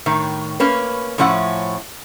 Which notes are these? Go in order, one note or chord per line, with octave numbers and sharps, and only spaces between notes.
A2 D#3
A#3 C#4 B4
A2 F3 C#4 E4 F#5